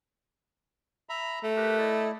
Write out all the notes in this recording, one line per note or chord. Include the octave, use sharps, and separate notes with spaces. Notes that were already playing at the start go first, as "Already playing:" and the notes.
E5 A#5 B5
A3
G4 A#4 B4
E4 D5 D#5